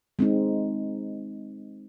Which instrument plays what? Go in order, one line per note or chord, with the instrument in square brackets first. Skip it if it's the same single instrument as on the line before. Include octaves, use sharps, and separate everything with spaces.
[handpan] G#3 C4 D#4